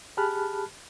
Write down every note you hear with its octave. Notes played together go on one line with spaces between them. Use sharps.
G4 G#4 A5 B5 F6 F#6